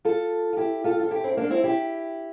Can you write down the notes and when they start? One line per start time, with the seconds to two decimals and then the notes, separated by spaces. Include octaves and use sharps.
0.05 F4 A4
0.53 F4
0.57 E4 G4
0.84 F4 A4
1.00 F4
1.11 E4 G4
1.24 C4 E4
1.37 A#3 D4
1.50 C4 E4
1.63 E4 G4